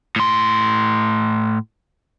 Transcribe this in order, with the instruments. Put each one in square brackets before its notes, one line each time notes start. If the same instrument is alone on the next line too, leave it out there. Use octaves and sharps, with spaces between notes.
[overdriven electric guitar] A2 C6